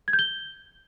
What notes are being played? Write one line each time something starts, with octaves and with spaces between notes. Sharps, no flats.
G#6
G6
G7